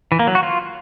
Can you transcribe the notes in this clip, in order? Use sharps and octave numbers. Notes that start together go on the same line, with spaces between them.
E3
A#3
F#3
F#4
F4